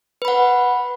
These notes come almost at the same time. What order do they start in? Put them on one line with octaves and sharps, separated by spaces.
B4 B5 F#5